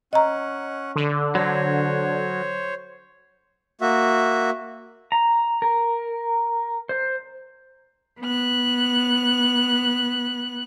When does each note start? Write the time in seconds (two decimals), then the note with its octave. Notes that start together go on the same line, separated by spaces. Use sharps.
0.13 C#4 D#5 F#5 A#5
0.96 D3
1.35 F#3 C5 C#5
3.81 A#3 F#4 E5
5.12 A#5
5.62 A#4
6.89 C5
8.20 B3 F#6